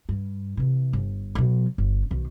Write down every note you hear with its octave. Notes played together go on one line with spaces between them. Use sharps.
G2
C3 E3
G1
B2 F#3
G1
B1 D#3